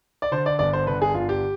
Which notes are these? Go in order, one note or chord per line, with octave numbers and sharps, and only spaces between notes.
D5
D3 C5
D5
G1 D5
C5
D3 B4
G#4
G1 F4
G4